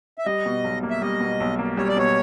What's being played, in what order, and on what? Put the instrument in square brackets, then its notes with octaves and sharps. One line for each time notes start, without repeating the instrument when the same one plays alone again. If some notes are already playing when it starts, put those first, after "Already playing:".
[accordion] E5
[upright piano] G3 [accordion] D#5
[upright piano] B2
B1
A#3
[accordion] E5
[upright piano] G3 [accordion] D#5
[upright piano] B2
B1
A#3
[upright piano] G3 [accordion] C#5
[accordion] D5
[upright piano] B2 [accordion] C#5